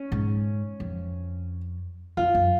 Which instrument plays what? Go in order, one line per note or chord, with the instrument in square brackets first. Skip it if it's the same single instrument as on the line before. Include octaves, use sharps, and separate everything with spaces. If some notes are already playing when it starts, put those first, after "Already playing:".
Already playing: [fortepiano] C#4
[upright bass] G#2
F2
[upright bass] F2 [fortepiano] F4
[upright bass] F#2